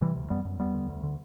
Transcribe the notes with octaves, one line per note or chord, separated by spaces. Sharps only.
C3 E3 G3
D2
F#2 G3 B3
F#2
E2 G3 B3
D3
D2
D3